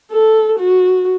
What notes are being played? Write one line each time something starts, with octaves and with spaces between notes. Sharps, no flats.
A4
F#4